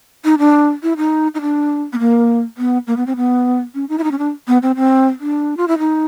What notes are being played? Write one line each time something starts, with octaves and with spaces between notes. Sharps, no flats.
D#4
D4
E4
D#4
D#4
D4
B3
A#3
B3
A#3
B3
C4
B3
C#4
D#4
E4
D#4
C#4
D4
B3
C4
C4
D4
F4
E4
D#4